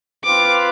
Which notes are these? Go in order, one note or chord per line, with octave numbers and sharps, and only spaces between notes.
C4 F4 B4 F5 D6